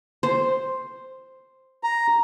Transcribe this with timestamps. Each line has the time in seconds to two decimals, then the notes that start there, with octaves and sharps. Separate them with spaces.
0.23 C5
1.83 A#5